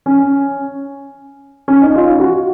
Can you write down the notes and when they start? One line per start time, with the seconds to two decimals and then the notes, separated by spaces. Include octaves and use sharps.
0.06 C#4
1.68 C#4
1.82 D#4
1.96 F4
2.20 F#4